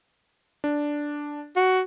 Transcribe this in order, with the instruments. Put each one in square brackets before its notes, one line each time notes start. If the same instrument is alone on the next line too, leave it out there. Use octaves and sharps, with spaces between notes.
[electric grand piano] D4
[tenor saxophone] F#4